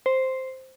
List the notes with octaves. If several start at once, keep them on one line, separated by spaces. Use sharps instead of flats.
C5